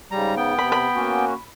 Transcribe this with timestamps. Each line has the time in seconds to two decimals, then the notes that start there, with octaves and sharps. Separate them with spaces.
0.11 G#2 C#3 G3 A#5
0.37 B3 G5
0.59 C3 B5
0.72 B5
0.95 A#3 C#4 F#4